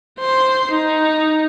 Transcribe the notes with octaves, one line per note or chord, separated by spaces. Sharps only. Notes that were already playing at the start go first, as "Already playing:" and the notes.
C5 C6
D#4